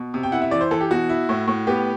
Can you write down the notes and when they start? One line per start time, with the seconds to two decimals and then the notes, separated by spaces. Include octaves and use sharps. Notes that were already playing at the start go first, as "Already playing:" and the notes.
Already playing: B2
0.14 C3
0.23 G5
0.32 E4 F#5
0.42 E5
0.51 E3 D5
0.61 C5
0.71 E3 A4
0.80 G4
0.91 B2 F#4
1.09 E4
1.29 A2
1.48 A2
1.67 B3 G4